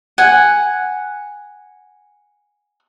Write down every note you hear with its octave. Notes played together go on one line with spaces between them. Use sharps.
F#5 G#5